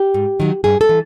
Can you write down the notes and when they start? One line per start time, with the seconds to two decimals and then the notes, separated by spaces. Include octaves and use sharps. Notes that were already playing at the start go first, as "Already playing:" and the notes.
Already playing: G4
0.14 G#2
0.40 D#3 F#3
0.64 G2 G#4
0.81 A4
0.89 E3